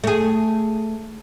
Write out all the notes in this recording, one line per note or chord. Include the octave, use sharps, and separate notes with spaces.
A3 G#4